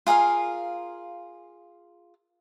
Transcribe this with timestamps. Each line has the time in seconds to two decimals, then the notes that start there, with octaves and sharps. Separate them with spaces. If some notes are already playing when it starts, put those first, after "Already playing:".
0.07 F4 G#4 A#4 F5